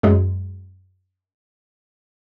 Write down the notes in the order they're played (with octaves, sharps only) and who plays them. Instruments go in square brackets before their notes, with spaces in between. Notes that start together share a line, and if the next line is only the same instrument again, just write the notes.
[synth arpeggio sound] F#2 G#3